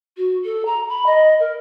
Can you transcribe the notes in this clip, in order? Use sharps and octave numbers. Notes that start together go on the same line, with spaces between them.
F#4
A4
A#5
B5
D#5
A#4